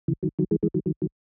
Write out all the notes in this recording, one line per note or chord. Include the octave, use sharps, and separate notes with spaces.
C#3 E3
D#3 F#3
D#3 F#3
E3 G#3
E3 G#3
D#3 F#3
D#3 F#3
D#3 F#3